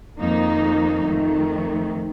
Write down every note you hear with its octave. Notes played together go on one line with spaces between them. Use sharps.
F2 D#3 A#3 D#4
F2 D#3 A3